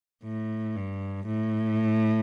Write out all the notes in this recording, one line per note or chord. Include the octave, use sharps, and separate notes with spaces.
A2
G2
A2